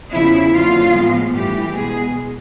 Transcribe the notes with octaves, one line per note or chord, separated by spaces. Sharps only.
E2 C#3 F3 E4
F2 D3 F#3 A#3 F4
A2 F3 G#3 B3
G2 E3 A3 G4
B2 G#3 B3 G#4